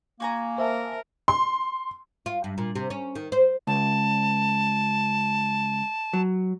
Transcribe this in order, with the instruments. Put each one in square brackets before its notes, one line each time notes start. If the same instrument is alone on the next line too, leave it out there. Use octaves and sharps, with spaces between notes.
[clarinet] A#3 [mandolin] F#4 G#5 A#5
[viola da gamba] A#4 [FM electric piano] C5 E5 A5
[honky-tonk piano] C6
[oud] F4
G2
A#2
C3
C#4
D#3
C5
[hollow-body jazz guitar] C#2 [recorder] A5
[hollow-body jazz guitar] F#3